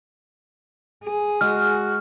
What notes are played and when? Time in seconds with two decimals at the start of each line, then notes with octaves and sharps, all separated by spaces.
1.04 G#4
1.41 G#3 F#4 F6